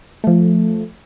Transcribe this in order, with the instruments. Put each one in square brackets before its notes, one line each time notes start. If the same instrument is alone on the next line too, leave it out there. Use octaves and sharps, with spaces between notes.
[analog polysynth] F3 A3